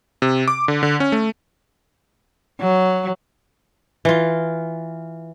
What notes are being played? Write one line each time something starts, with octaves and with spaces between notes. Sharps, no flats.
C3
D6
D3
D3
C#4
A3
F#3
E3 F4